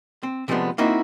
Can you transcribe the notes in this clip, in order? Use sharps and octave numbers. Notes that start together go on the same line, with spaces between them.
C4
C3 F3 G#3 A3 B3 D4
A#3 C4 D#4 E4 F#4